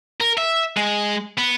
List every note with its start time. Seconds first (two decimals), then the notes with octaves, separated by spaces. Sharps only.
0.21 A#4
0.38 E5
0.77 G#3
1.38 B3